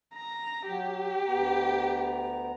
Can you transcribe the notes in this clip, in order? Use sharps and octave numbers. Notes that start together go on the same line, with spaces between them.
A#5
F#3 G4
D2 B3 A#5